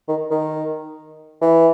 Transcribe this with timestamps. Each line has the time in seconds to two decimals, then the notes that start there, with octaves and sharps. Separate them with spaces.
0.08 D#3
0.31 D#3
1.41 E3